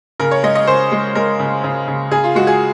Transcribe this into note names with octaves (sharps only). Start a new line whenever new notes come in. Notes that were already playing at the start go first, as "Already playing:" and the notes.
C#3 A#4
C#5
G#3 D#5
D#5
C#3 C5
G#3
G#3 A#4
C#3
C#3
C#3
C#3 G#4
F4
G#3 F#4
G#4